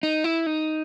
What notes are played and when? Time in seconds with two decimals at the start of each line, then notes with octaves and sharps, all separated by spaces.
0.03 D#4
0.24 E4
0.46 D#4